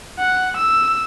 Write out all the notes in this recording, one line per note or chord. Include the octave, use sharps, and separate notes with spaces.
F#5
E6